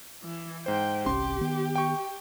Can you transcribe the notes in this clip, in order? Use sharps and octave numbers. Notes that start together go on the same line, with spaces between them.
E3
G#2 C5 G5
G1 C2 C#4 G4 C6
D#3 B3
G5 C#6